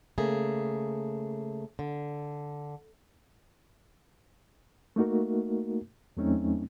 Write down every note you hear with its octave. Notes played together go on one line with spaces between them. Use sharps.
C#3 A3 A#3 G#4
D3
A3 A#3 D#4 F#4 A#4
E2 F#3 A3 C4 C#4 D#4